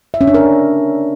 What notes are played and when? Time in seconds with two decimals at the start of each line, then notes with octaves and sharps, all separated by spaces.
0.14 E5
0.21 C#4
0.28 D4
0.34 A#4